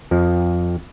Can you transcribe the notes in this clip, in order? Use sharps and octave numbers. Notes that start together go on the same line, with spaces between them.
F2 F3